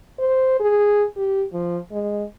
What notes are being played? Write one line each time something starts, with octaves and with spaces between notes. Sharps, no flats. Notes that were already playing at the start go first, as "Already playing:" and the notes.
C5
G#4
G4
F3
G#3